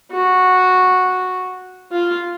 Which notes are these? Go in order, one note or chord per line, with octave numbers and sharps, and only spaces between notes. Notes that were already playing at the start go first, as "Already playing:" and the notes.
F#4
F4